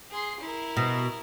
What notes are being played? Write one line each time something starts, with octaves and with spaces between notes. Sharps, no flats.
G#4 C6
E4 A#4
B2